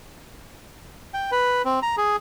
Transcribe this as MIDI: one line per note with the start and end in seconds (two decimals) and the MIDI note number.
1.14 1.31 79
1.32 1.62 71
1.65 1.80 60
1.83 1.96 82
1.97 2.16 68